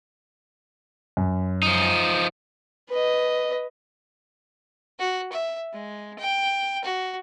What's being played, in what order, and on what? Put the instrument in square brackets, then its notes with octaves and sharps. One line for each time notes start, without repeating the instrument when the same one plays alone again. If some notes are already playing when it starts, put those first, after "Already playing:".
[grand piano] F#2
[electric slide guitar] F3 D#4
[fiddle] B4 D#5
F#4
E5
G#3
G5
F#4